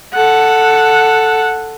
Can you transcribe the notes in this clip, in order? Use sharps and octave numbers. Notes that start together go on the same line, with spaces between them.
A4 F#5